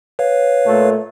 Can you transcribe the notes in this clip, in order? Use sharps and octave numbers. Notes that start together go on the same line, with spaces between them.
B4 C#5 F5
A#2 A3